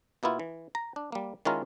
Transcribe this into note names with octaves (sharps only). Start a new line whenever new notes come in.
B2 A#3 B3 E4 F4
E3
A#5
D4
G3 A#3
D#3 G#3 C#4 E4 F4 A#4